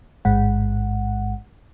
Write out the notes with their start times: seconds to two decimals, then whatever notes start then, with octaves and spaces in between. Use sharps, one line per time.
0.25 A1 G#2 G#3 F#5